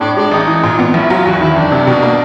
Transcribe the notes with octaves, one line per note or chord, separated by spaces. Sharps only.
A2 D4
G#3 D4
A1 D#4
E3
A#2
B3
A#1 E4
F#3 F4
E2 F#4
D#3 E4
F#1 D4
C3
B2
A#3